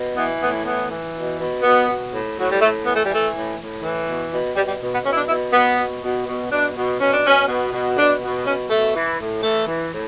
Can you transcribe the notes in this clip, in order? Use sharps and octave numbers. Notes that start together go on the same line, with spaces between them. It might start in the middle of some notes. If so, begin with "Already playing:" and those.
Already playing: B2
E3 B3
A2 B3
E3 B3
E3
B2
B2
B2 B3
B2
A2
A2 F#3
G3
A2 A3
E3 B3
A3
E3 G3
A3
A2
A2
E3
B2
B2
B2 G3
G3
B2
B3
B2 C#4
E4
D4
B2 E4
B2 B3
B2
B2
B2
B2 D4
B2
B2 C#4
D4
B2 C#4
B2
B2
B2 D4
B2
B2 C#4
B2 A3
E3
A2
E3 A3
E3
A2